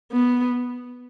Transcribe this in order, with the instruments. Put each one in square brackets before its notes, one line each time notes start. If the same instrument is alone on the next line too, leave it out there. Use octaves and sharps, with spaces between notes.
[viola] B3